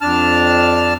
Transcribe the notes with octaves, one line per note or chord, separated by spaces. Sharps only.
F2 D4 A5 F6